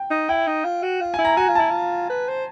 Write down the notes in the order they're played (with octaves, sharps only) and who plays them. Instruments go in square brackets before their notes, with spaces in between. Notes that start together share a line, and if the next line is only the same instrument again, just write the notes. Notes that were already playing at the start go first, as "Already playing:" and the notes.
Already playing: [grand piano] G5
[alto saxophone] D#4
[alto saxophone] E4 [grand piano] G5
[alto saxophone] D#4
F4
F#4
F4
[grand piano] G#5
[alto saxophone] E4
[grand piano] A#5
[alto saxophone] F#4 [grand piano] G#5
[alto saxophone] F4
[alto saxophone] E4 [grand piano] A5
[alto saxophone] F4
B4
C5